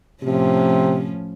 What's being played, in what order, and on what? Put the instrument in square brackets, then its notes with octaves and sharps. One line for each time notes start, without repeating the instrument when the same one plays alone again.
[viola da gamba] A2 F3 C#4 [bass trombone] C3